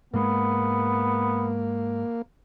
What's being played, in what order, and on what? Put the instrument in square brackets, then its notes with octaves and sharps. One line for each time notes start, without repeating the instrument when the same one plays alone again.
[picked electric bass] G#2 G#3 [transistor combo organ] A#3 [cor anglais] B3